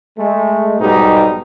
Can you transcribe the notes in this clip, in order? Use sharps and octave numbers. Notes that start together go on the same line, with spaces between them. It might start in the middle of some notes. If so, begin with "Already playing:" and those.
G#3 A3
B1 G#2 B2 G3 D#4 G4